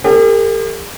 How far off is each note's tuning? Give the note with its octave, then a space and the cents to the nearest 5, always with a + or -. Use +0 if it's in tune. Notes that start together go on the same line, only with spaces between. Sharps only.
G4 +45 A#4 -40